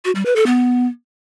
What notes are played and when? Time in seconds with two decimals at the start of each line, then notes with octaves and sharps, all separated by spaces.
0.05 F#4
0.15 G3
0.26 B4
0.36 A4
0.46 B3